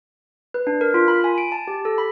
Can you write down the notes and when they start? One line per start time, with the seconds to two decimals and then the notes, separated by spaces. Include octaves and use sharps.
0.54 B4
0.67 D4
0.81 A#4
0.94 F4
1.08 B5
1.24 G#5
1.38 D7
1.52 A5
1.67 G4
1.85 A4
1.98 B5